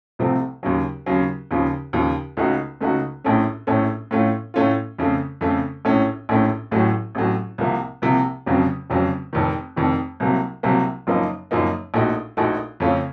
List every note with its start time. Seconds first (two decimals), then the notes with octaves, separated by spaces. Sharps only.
0.19 C2 C3 F3 A3 C4
0.63 D#2 C#3 F#3
1.06 D#2 C#3 F#3
1.51 D#2 C#3 F3
1.93 D#2 C#3 F3
2.37 C#2 C#3 A3 D#4 F#4
2.81 C#2 C#3 A3 D#4 F#4
3.24 A#1 A2 A3 C#4
3.67 A#1 A2 A3 C#4
4.11 A2 A3 C#4 F4
4.54 A2 A3 C#4 F4
4.98 F2 C#3 A3
5.41 F2 C#3 A3
5.85 A#1 A2 A3 C#4
6.29 A#1 A2 A3 C#4
6.71 A1 A2 F#3 A3
7.15 A1 A2 F#3 A3
7.58 C2 C3 F3 A#3
8.02 C2 C3 F3 A#3
8.46 F1 F2 C#3 F#3
8.90 F1 F2 C#3 F#3
9.33 F1 F2 D#3
9.76 F1 F2 D#3
10.20 C2 C3 F#3 A#3
10.63 C2 C3 F#3 A#3
11.07 F#1 F#2 F3 A#3 D#4
11.51 F#1 F#2 F3 A#3 D#4
11.94 A#1 A#2 A3 D#4 F#4
12.37 A#1 A#2 A3 D#4 F#4
12.80 F2 C#3 A3 C#4 F4